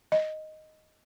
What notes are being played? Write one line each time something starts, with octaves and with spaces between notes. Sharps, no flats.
D#5